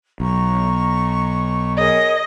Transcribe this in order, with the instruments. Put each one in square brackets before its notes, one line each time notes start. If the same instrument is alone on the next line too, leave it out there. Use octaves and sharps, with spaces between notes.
[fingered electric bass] B1 [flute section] A#5 C#6
[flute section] G#4 A#4 C#5 [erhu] D#5